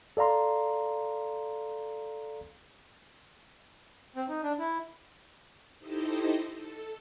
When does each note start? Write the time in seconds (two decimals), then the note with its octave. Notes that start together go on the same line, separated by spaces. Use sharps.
0.17 A4 D5 F5 A#5 C6
4.16 C4
4.28 D#4
4.43 D4
4.59 E4
5.79 D#4 E4 G4 A4 C5 D#5
6.56 A4